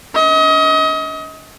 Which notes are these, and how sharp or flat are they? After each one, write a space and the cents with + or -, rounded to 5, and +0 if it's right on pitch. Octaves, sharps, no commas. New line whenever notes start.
D4 -45 D#5 +30